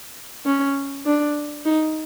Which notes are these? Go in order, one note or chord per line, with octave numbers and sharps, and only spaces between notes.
C#4
D4
D#4